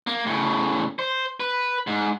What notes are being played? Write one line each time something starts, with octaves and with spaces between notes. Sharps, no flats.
A#3
A2 C#3
C5
B4
G#2